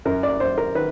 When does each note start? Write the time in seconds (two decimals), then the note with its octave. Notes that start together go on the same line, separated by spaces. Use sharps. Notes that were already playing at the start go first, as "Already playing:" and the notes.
0.05 F#2 A#4
0.23 D5
0.40 F#2 C5
0.58 A#4
0.75 D#3 B4